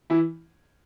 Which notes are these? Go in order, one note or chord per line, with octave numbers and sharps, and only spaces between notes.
E3 E4